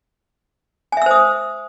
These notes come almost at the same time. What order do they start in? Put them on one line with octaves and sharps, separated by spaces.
G#5 E5 E6 C5 D#6